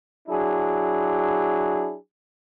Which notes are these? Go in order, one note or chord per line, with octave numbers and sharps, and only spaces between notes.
F#3 D4 E4 G#4